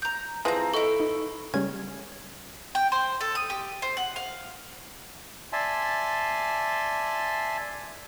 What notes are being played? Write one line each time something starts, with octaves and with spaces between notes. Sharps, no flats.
A#5 G6
E3 F3 C4 G#4 A#5
E4 A4 D#5 C#6
D#4
C#3 G3 C#4 G#6
G5
C5
A4
D#6
G4
C5
F#5
F5
D5 E5 G#5 A5 C6